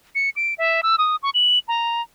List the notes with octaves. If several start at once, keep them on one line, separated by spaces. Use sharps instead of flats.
C#7
D7
E5
E6
D#6
C#6
F#7
A#5